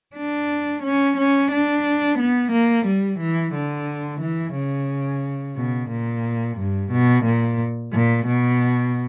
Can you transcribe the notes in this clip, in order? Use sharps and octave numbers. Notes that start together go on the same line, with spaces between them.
D4
C#4
C#4
D4
B3
A#3
G3
E3
D3
E3
C#3
B2
A#2
G2
B2
A#2
A#2
B2